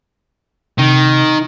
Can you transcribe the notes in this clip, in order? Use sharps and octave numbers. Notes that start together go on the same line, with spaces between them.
C3 D#3